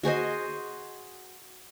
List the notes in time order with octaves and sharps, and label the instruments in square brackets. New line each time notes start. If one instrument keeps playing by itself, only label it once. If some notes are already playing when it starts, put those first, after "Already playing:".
[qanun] F#4 G#4 C5 D#5